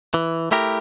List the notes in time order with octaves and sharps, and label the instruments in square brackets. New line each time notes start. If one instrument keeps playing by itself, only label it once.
[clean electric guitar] E3
A3 E4 G4 A#4